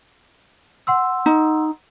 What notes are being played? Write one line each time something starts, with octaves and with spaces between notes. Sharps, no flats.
F#5 C6 E6
D#4